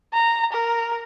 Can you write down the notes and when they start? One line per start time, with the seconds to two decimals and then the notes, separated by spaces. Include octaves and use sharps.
0.13 A#5
0.52 A#4